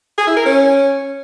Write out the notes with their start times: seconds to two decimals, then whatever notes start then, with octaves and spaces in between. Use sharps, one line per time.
0.18 G#4
0.27 E4
0.36 A#4
0.46 C#4